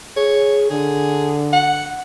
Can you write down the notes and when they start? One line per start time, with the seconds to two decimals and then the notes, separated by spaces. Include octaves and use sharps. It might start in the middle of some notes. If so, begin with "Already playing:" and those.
0.17 G#4 C#5
0.71 D3 G#4
1.53 F#5